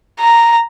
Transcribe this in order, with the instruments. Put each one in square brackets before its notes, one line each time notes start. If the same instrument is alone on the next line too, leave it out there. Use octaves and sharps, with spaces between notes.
[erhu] A#5